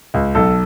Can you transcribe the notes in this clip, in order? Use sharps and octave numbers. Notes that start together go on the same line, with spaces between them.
C#2
B1 A4